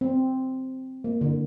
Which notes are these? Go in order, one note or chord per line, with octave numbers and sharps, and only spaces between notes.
C4
A#3
D3